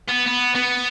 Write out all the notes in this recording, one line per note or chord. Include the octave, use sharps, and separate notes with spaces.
B3
B3
B3